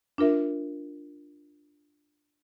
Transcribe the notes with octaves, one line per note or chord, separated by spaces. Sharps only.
D4 F4 A#4 E5